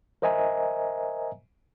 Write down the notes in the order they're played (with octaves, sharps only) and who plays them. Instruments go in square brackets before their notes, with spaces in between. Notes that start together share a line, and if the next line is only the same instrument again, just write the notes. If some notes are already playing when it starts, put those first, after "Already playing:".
[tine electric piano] A#4 C5 D#5 E5 G#5 A#5